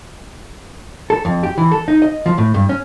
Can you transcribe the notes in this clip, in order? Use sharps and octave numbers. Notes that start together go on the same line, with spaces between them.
A4
F2
G4
E3
A4
D#4
D#5
F3
A2
G2
C#4